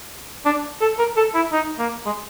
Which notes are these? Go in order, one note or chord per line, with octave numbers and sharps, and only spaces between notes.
D4
A4
A#4
A4
E4
D#4
A#3
G#3